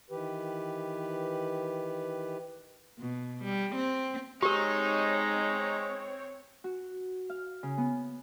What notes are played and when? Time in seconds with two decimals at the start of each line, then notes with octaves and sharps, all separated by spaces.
0.10 D#3 E3 G4 B4
2.98 B2
3.43 G3
3.75 C4
4.42 G#3 C4 D#4 G4 A#4 C#5
6.64 F#4
7.30 F5
7.63 C#3
7.78 B3